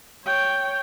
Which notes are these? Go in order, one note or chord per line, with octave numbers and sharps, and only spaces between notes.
C#5 G5